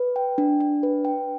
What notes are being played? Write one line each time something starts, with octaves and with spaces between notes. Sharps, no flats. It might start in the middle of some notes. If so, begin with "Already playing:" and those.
Already playing: B4
G5
D4
D4
B4
G5